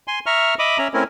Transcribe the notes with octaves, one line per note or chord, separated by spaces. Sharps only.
G#5 C6
E5 A#5 C#6 F6
D#5 E5 B5 D6 D#6
C#4 E5 A#5
A3 C4 C#4 E4 A#4